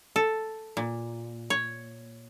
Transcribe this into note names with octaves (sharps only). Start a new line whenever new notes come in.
A4
A#2
C#5